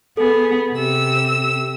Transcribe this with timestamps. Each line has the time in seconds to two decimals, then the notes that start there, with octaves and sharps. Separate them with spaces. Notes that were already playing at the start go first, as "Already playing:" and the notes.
0.17 B3 G#4 A4
0.73 C3 E6